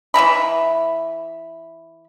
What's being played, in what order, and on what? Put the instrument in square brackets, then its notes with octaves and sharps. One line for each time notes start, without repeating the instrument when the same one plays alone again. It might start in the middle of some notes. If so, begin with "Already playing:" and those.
[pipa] E3 E5 A#5 B5